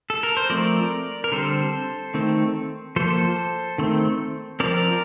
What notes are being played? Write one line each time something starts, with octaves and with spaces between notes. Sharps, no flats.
A4
A#4
C5
F3 A3 C4 A#4 D5
A#4
D3 G3 C4 A4 C5
D#3 A3 C4
F3 A#3 A4 C5
D#3 A3 C4
F3 C4 A#4 D5